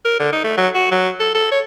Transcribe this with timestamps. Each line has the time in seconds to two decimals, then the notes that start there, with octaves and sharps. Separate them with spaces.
0.05 A#4
0.19 D3
0.32 D#4
0.44 A3
0.57 F#3
0.75 F#4
0.91 F#3
1.20 A4
1.35 A4
1.52 C#5